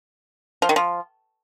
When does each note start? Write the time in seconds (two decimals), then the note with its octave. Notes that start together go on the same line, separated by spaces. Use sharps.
0.62 F3
0.69 D#3
0.76 F3